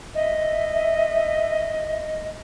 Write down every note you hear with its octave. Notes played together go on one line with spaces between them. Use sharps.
D#5 E5